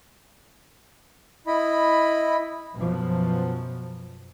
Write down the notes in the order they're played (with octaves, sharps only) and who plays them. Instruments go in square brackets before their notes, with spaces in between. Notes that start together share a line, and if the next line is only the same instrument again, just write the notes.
[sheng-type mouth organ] E4 D#5 B5
[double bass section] F#2 B2 F3